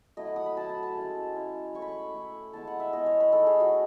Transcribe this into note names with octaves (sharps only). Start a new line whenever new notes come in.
F#3 A3 E4 D#5
F#5
D#6
B5
F#3 A3 E4 A5
A5
A5
G#3 C#4 E4
G#3 C#4 E4
A3 E4 C#6
B5
C#6
A3 E4
G#3 B3 E4 A5
F#5
E5
G#3 B3 E4 D#5
C#5
B4
A3 D#4 A4
G#4
F#4